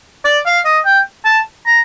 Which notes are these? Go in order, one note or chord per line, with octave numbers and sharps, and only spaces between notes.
D5
F5
D#5
G5
A5
A#5